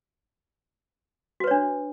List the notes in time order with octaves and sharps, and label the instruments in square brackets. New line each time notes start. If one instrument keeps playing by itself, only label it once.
[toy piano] F#4
B4
C#5
D4